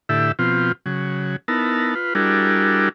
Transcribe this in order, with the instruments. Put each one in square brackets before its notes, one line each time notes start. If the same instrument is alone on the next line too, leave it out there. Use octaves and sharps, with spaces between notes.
[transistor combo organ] A2 D3 E4 G4 E5
B2 F3 C4 F4
C#3 F#3
B3 D#4 E4 A#4 A5
F4 B4
G3 D4 E4 F#4 G#4 A#4